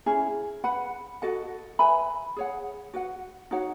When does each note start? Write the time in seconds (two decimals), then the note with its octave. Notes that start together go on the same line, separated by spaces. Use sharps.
0.06 C#4 E4 G#4
0.64 B4 F#5 B5
1.22 F#4 A4 D#5 F#5
1.79 B4 E5 G#5 B5
2.36 G#4 C#5 F#5
2.94 F#4 B4 F#5
3.51 D#4 F#4 C#5 F#5